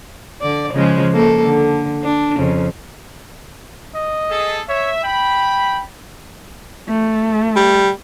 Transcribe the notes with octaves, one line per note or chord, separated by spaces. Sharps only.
D3 D5
C#3 F3 G#3
A#3 A4
D3
D4
F2 C#3
D#5
G#4 A4
C#5 E5
G5 B5
A3
G3